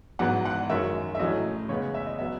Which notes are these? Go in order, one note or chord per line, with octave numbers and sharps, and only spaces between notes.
G#2 F#3 B3 F#5
F#5
F#2 D#3 G#3 C#4 E5
E5
A2 F#3 A3 C#4 D#5
C#3 G#3 B3 C#5
E5
D#5
F#3 B3 E5